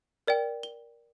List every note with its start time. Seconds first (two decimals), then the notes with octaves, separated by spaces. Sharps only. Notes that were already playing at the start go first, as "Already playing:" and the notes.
0.27 A#4 D5 G5
0.63 G7